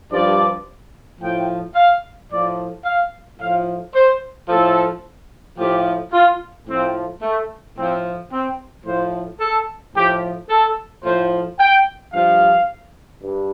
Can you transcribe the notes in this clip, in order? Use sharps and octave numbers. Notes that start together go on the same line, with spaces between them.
G2 F3 D5
A2 F3 G5
F5
A2 F3 D5
F5
A2 F3 F5
C5
A2 F3 A4
A2 F3 G4
F4
A2 F3 C4
A3
A2 F3 C4
C4
A2 F3 C5
A4
A2 F3 G4
A4
A2 F3 C5
G5
G2 F3 F5
G2